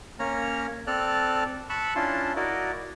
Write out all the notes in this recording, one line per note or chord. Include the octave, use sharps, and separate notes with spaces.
A#3 C#4 C#5 A#5 F6
C4 A4 D5 A5 F6 F#6
A5 B5 C#6 E6 F#6
C#4 D4 E4 F4 A5 C6
E4 F#4 A#4 D5 D#5